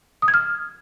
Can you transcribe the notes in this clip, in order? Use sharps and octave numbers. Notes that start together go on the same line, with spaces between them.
D#6
G#6
F6